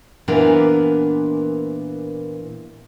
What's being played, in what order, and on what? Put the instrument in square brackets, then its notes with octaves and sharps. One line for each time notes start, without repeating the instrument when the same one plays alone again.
[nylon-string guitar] A#2 E3 B3 D4 A#4